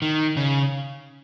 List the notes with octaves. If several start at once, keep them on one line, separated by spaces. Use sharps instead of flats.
D#3
C#3